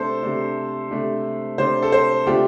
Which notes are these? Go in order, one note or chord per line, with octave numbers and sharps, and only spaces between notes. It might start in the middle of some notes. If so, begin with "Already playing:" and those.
Already playing: C3 A3 D4 A4 C5
C3 A3 D4
C3 A3 D4
C3 A3 D4 C5
A4
C5
C3 A3 D4 F4 G4